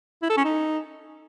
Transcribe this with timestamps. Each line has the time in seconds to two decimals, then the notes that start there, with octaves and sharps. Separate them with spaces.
0.22 E4
0.30 A4
0.37 C#4
0.45 D#4